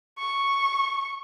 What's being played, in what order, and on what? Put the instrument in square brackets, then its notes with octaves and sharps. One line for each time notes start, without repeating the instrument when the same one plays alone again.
[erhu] C#6